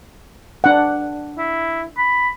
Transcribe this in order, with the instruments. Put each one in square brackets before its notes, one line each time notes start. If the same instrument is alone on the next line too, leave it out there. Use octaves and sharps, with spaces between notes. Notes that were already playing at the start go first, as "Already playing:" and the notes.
[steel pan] D4 F#5
[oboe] E4
B5